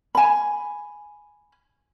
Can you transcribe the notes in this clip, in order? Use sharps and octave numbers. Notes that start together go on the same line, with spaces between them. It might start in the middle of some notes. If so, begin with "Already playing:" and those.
G#5 B5